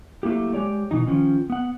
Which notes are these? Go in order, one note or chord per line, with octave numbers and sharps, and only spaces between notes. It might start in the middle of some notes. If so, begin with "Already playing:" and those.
F#3 A3 A#3 E4 G4
G#3 G4 C#5 D5
B2 E3 D#4
D#3 F3 C#4
B3 F#5